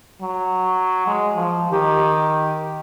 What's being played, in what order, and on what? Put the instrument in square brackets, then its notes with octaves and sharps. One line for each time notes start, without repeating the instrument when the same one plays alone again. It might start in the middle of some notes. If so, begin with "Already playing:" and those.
[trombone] F#3
G#3
F3
[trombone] D#3 [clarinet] G4